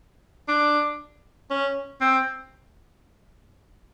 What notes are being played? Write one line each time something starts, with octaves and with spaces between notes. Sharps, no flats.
D4
C#4
C4